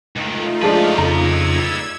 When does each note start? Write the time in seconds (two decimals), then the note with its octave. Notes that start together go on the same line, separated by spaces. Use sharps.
0.17 C#2 D#3 A3 D#4 F4
0.62 F3 G#3 D4 B4 D5
0.98 F2 C#3 D#4 A#5 E6 G#6